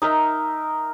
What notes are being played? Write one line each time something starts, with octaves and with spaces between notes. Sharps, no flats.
D#4 A#4 E5